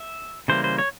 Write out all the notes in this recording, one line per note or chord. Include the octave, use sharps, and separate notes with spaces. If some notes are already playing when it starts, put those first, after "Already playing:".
Already playing: E5
C#3 E3 G3 A#3 C5
C5
C#5